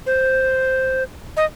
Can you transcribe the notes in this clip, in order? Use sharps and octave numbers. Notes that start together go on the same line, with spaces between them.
C5
D#5